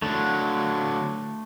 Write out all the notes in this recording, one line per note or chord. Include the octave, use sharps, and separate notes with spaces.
D3 F#3 A3